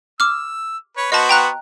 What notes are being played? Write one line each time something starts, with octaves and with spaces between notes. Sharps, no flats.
D6 E6 F6
B4 C#5
B3 F#4 C5 D#5 A5
G5 A#5 F#6